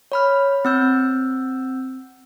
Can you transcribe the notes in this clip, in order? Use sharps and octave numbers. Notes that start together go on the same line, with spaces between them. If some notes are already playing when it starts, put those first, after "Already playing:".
C#5 B5 F6
C4 E6 G6